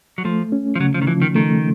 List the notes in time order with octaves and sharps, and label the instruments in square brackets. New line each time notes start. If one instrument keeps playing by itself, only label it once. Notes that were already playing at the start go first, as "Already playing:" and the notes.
[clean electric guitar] F#3
[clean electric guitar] F3 [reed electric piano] A3
[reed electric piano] C#4
[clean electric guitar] F3
[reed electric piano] C#3 [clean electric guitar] F#3
[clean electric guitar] F3
D#3
[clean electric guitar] E3 [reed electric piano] F3
[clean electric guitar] D#3
[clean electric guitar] D#3 [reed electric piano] A3